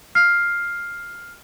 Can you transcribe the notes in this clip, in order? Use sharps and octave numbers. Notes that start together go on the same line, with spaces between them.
F6 C7